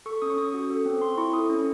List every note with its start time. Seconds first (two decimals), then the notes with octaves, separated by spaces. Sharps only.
0.06 A4 C#6
0.22 C#4 D#6
0.30 C#6
0.38 C#4 D#6
0.54 F#4
0.70 A4
0.86 C4
1.02 C4 C6
1.17 E4 C#6
1.33 A4 D#6
1.50 C#4